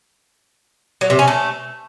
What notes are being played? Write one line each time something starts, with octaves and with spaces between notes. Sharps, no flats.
F#3
C3
C#4
A3